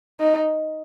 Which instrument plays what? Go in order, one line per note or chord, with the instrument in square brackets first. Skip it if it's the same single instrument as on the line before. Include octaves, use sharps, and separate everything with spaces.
[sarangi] D#4